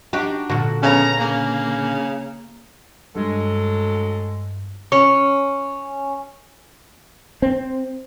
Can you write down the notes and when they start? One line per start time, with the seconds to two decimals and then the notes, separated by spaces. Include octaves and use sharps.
0.13 D4 D#4 F#4 G4
0.50 A#2 D3 F#4
0.83 C#3 B3 C#4 A#5
1.20 C#3 A#3
3.16 D2 G2 F#3 G#3 A4
4.92 C#4
7.42 C4